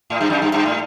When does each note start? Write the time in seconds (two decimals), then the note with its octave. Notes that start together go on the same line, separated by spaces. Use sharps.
0.10 A2
0.21 G2
0.30 F#2
0.42 G2
0.53 G2
0.66 A2